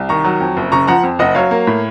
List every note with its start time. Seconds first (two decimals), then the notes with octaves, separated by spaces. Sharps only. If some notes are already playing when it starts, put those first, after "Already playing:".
Already playing: C2
0.09 D#3 A#5 C#6
0.25 F#3
0.40 F2
0.57 F#1
0.72 C#3 A#5 C#6
0.87 F3 F#5 A#5
1.03 F2
1.19 F#1 D#5 F#5
1.35 F#3 C#5 F5
1.51 A#3
1.67 A2